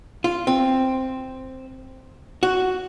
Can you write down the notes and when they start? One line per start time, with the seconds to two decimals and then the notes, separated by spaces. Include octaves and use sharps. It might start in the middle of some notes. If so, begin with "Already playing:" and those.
0.24 F4
0.47 C4
2.43 F#4